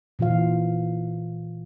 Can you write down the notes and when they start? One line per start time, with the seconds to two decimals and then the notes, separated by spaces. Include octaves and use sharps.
0.19 A#2 E3 F4 F5